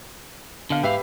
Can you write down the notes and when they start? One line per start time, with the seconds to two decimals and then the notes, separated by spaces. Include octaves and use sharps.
0.70 B2 D3 F5
0.83 G#2 G4 B4 E5 F5